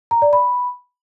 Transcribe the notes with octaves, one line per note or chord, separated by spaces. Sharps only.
A#5
D5
B5